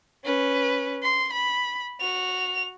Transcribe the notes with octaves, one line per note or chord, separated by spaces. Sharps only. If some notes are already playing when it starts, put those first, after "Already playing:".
C#4 B4
C6
B5
F#4 F7